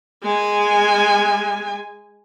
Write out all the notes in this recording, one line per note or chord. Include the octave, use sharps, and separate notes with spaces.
G#3 G#5